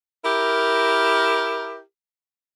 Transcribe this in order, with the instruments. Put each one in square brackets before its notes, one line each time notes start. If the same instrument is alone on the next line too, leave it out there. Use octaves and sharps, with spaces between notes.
[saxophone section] E4 G4 A#4